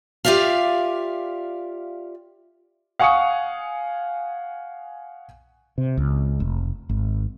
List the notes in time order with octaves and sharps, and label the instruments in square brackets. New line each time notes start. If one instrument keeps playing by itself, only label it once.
[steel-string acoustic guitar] F4 G4 D5 E5 F5
[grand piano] F5 F#5 G#5 C#6 D#6 C#7
[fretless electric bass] C3
C#2
F1
G#1